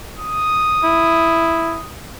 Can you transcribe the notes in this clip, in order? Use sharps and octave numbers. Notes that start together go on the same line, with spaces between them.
D#6
E4